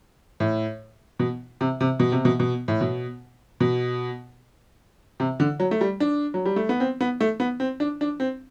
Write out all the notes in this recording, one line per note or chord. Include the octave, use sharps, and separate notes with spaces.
A2
B2
C3
C3
B2
C3
B2
B2
A2
B2
B2
C3
D3
F#3
A3
G3
D4
F#3
G3
A3
B3
C4
B3
A3
B3
C4
D4
D4
C4